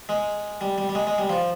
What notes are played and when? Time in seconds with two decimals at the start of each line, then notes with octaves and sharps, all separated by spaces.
0.09 G#3
0.61 G3
0.78 G3
0.89 G3
0.95 G#3
1.07 G#3
1.18 G3
1.30 F3